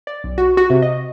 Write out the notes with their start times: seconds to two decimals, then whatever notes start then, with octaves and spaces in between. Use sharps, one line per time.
0.07 D5
0.24 B1
0.38 F#4
0.57 F#4
0.70 C3
0.82 D#5